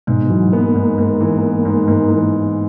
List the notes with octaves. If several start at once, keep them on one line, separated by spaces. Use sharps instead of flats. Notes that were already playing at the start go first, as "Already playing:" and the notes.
G#2 B2
E3 F#3
A#3 B3
G#2
G#2
E3
B3
G#2
G#2
E3